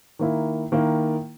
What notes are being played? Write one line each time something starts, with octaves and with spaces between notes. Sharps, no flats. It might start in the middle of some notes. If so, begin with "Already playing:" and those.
D#3 A#3 E4
D#3 A#3 E4